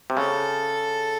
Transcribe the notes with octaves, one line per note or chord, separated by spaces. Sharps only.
C3
C#3 A4